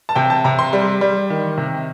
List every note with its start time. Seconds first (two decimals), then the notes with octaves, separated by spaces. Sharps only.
0.09 A5
0.15 C3 G5
0.30 A5
0.44 C3 A#5
0.59 C6
0.73 G3
1.01 G3
1.30 D#3
1.58 C3